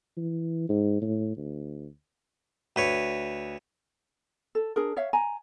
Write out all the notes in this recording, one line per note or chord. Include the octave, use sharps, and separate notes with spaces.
E3
G#2
A2
D2
D2 B4 C#5
A4
D4 G#4 A#4
C#5 E5 F5
G#5 A#5